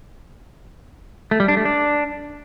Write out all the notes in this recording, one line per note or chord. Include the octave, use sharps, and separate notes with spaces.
A3
G3
D4
A3
D4